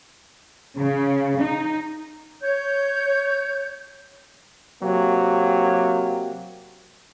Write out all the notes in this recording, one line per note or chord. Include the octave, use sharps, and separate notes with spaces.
C#3
D#4
C#5 G6
C3 F#3 A#3 G4